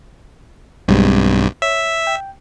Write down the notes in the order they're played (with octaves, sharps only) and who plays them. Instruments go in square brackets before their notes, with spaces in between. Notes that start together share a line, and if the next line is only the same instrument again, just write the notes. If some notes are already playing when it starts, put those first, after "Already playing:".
[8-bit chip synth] B1 G2 [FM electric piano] G3 G#3 C4
[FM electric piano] C#5 [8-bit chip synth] E5
[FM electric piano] G5